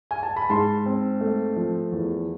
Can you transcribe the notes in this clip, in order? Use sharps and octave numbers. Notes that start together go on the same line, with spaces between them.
G#5
A5
B5
G#2 A5 C6
C4
A3
F3
E2